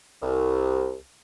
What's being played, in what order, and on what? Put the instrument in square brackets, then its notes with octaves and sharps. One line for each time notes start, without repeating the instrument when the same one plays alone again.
[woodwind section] C2